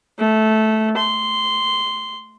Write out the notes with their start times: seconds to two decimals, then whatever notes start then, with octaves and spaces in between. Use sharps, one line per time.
0.19 A3
0.97 C6